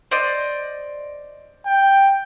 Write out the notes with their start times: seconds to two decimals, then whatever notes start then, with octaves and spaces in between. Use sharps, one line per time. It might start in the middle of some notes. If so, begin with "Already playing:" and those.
0.11 C5 D5 D#5
1.66 G5